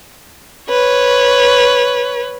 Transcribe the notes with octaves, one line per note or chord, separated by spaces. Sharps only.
B4 C#5